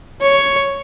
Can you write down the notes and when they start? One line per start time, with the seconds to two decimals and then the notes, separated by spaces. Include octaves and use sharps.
0.22 C#5